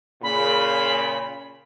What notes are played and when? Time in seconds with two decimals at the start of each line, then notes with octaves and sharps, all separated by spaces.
0.23 A#2 C#3 B5